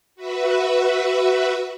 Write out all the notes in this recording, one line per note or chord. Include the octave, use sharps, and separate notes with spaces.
F#4 B4 E5